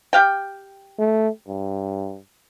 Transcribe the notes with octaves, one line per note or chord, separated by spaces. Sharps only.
G4 F5 G5
A3
G2